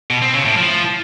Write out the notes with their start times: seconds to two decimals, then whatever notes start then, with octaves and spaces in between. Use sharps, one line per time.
0.10 B2
0.22 C4
0.33 C#3
0.45 A2
0.56 F3